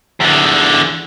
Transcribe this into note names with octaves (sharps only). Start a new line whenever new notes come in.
E2 D3